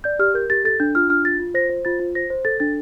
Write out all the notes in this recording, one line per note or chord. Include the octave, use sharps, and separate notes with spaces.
D5 G6
G4 F6
A#4 G6
G4 A6
A4 A6
D4 G6
F4 F6
D4 F6
F4 A6
F4
C5 A#6
C5
F4 A6
F4
C5 A#6
C5
A4 A6
D4 A6